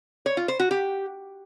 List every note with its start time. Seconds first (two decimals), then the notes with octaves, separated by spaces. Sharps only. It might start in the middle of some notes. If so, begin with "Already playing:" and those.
0.26 C#5
0.37 F4
0.48 C5
0.60 F#4
0.71 G4